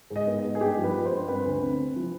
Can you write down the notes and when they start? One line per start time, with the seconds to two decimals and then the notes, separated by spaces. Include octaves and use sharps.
0.10 G#2
0.16 D#5
0.27 B3
0.39 D#5
0.44 G#2
0.55 G#4
0.61 G2 G4
0.78 F3
0.84 B4
0.95 F3
1.06 C5
1.12 G2
1.28 C4 B4
1.45 D2
1.62 C3
1.79 C4
1.96 F3